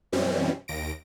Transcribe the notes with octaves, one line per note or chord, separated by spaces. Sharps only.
F#2 B2 E3 G3 C4 C#4
D#2 A#6 D7